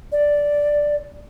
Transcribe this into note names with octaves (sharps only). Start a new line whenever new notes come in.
D5